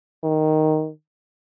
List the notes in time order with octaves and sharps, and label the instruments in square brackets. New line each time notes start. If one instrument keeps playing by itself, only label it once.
[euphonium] D#3